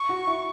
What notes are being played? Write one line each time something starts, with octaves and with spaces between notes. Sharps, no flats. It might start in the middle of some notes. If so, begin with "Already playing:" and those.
Already playing: C#6
F#4
E4